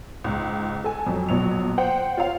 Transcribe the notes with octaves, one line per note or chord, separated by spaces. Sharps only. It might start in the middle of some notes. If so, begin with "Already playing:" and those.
C#2 G#2
A4 G#5
F2 F#3
A#1 B2 F#3 F7
C5 F#5 G5
F4 C#5 F5